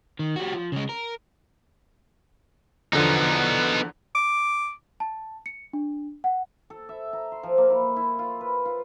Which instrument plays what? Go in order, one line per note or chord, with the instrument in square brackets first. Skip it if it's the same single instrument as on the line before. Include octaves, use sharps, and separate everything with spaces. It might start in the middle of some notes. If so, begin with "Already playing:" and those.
[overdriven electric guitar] D#3
G3 F#4
F3
C#3 G#3
A#4
[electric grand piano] E2 D3 F3 [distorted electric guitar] B3 D#4
[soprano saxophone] D6
[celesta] A5
C#7
D4
F#5
[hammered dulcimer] A4
E5
A#5
C6
F3
A#3
E4
E4
F4
B4
F4